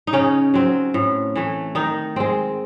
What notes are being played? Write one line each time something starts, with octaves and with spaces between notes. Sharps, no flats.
D#4
C#3 C#4
F#3 C4
A2
E3 A3
D#3 D#4
G#3 C4